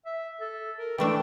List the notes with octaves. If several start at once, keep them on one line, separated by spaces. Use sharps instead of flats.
E5
A4
A#4
E3 A3 D4 G5